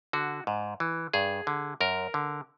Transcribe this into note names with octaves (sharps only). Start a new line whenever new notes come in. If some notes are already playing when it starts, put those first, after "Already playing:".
D3 F#4
G#2
E3
G2 G#4
D3
F#2 A#4
D3